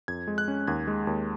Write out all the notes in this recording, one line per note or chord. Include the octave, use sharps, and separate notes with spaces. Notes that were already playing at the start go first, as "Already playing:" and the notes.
F2 G#6
G#3
F#6
C#4
D#2 G#6
G#3
D#2